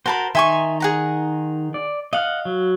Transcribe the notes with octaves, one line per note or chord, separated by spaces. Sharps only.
F#4 A#4 C5 A5 B5
D#3 D#4 E5 G#5 C6 C#6
G#4 F#5 A#5
D5
D#5 F5 F#5 F6
F#3